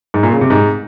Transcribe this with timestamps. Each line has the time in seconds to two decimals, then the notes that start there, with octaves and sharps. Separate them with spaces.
0.14 G#2
0.23 A#2
0.32 C#3
0.41 C3
0.50 G#2